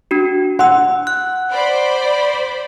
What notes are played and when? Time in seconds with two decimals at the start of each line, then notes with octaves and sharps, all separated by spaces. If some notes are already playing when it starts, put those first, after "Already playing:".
0.11 D4 F#4
0.59 F#5 C6 E6
1.07 F#6
1.51 C5 D5 B5